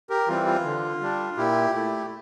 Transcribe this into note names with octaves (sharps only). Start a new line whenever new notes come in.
G4 A#4
E3 G3 C4 F4
F4
D3
G3 D4
A#2 E4 G4
A3 E4